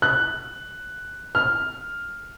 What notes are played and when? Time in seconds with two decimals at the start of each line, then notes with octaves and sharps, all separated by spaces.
0.02 F#6
1.35 F6